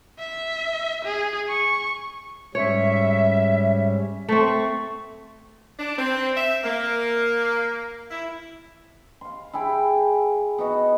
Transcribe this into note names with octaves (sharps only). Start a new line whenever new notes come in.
E5
G#4
C#6
G#2 G3 C#4 C#5 E5
A3 C4 C#6
D4
C4
E5
A#3
E4
F5 C6
E4 G#4 G5
B3 D#4 F#4